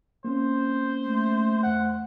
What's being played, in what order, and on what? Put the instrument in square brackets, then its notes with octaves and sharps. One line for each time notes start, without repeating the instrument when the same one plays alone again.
[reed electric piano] A#3 C4 C#4 [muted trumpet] C5
[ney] A3
[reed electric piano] E2 C5 [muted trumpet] F#5